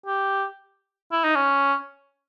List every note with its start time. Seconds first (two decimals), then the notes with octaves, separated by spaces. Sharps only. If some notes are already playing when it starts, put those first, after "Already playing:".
0.06 G4
1.12 E4
1.24 D#4
1.36 C#4